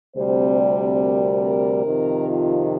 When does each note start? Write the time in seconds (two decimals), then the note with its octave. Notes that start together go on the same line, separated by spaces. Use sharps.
0.14 D2 C3 G3 C4 C5
0.57 D5
0.99 A#4
1.42 A#4
1.84 F2 C3 D#3
2.27 F4